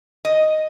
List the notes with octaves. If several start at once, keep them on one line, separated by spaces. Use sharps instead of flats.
D#5